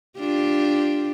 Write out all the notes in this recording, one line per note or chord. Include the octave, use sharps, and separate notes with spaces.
D4 F4 G4